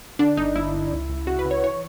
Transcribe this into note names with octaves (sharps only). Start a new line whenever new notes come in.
D3 D4
G1 D#4
G1 E4
G1
C#2
C#2
C#3 F#4
B4
C#3
C#5
E3 C#5